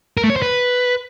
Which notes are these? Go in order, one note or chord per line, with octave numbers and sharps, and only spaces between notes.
A#4
A3
C#5
C5
B4